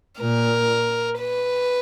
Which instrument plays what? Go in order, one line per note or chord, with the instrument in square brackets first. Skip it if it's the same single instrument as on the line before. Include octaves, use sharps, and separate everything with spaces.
[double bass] A#2 [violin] A#4
[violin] B4